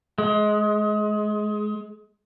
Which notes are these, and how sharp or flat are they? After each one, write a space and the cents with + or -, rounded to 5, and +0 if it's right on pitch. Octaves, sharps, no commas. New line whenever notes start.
G#3 +25